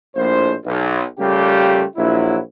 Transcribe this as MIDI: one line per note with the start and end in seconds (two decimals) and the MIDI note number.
0.16 0.52 34
0.16 0.52 45
0.16 0.52 72
0.65 1.01 35
1.19 1.83 49
1.19 1.83 55
1.19 1.83 57
1.19 1.83 58
1.19 1.83 65
1.19 1.83 67
1.97 2.37 34
1.97 2.37 54
1.97 2.37 64